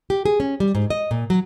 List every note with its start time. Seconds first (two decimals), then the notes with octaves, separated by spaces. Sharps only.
0.10 G4
0.25 G#4
0.40 C#4
0.60 G3
0.75 G#2
0.90 D#5
1.11 A#2
1.30 F#3